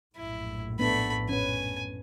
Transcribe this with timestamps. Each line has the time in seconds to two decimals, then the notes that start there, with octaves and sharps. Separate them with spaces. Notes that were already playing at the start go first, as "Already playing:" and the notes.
0.17 A#1 F#2 A2 E4
0.79 A3 B3 D4 B5
1.29 C#4 B4 G#5